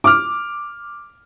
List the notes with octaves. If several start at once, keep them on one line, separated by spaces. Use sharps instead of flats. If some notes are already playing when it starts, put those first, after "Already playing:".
D6 F6